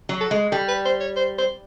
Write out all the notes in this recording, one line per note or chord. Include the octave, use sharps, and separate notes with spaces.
F#3
A4
G#3
G3 A4
B4
C5
C#5
C5
C5